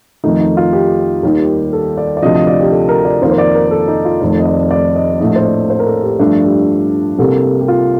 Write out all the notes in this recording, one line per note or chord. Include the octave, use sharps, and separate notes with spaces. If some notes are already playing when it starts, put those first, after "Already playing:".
F2 D#3 A3 D#4
D#4
F4
G4
D#2 D#3 G3
A4
D5
D5
D2 C3 F3 D#5
D#5
D5
G4
A4
A#4
D5
F2 D#3 A#3 C5
C5
D5
A#4
A#4
A4
D#4
F4
F1 F2 D#3 A3
D#5
D5
D5
D#5
A#1 A2 A3 D#5
C5
D5
C5
A#4
A4
G4
G2 F3 A3 D4
G4
C2 C3 G3 A#3 A4
G4
F4